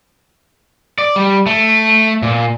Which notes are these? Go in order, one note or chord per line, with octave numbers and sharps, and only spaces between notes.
D5
G3
A3
A#2